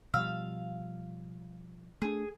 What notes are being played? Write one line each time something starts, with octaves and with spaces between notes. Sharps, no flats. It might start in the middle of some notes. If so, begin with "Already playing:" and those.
B2 F3 G3 F5 E6
A3 D4 G#4